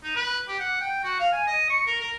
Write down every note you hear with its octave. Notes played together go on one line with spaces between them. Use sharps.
D#4
B4
G4
F#5
G5
F#4
F5
G#5
D#5
C#6
A#4
A#4